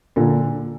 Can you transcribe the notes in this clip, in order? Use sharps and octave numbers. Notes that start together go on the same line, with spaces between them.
A#2 D3